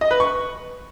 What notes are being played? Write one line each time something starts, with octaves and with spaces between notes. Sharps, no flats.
D#5
B4
C#6